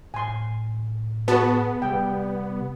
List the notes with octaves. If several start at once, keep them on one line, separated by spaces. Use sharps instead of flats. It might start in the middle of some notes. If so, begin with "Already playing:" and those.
A2 G#5 C6
B3 F#4 G#4 A5
C3 G3 G5